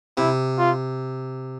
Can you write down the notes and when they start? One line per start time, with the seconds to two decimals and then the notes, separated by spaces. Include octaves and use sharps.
0.17 C3 E4
0.58 F4